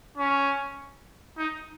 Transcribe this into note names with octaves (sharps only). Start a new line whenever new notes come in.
C#4
D#4